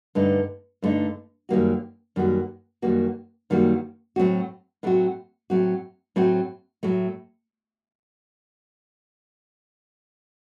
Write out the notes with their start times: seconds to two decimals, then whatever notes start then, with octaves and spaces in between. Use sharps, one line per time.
0.15 G2 D3 A3 D#4
0.82 G2 D3 A3 D#4
1.49 F#2 D#3 G3 A#3 F#4
2.16 F#2 D#3 G3 A#3 F#4
2.82 F#2 D#3 G3 A#3 F#4
3.50 F#2 D#3 G3 A#3 F#4
4.16 A2 F#3 A3 C4 F#4
4.83 A2 F#3 A3 C4 F#4
5.50 A2 F#3 A3 C4 F#4
6.16 A2 F#3 A3 C4 F#4
6.83 A2 F#3 A3